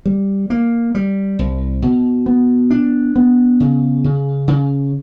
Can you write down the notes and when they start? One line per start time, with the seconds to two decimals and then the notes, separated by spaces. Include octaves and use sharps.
0.06 G3
0.50 A#3
0.95 G3
1.39 C2
1.82 B2
2.26 B3
2.70 D4
3.16 B3
3.60 C#3
4.04 C#3
4.48 C#3